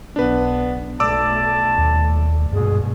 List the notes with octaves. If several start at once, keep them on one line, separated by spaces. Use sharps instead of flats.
B1 B3 D4 B4
B1 A3 D5 A5 D6 E6
D#2
A#1 G2 B2 G#3 G#4